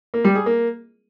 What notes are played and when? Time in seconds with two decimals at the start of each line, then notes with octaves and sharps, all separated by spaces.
0.14 A#3
0.25 G3
0.35 G#4
0.46 A#3